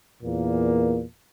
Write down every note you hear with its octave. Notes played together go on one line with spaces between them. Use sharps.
E2 A#2 A#3